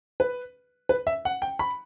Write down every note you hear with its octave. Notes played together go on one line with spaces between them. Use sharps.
B4
B4
E5
F#5
G5
B5